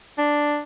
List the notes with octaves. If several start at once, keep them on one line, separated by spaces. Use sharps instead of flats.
D4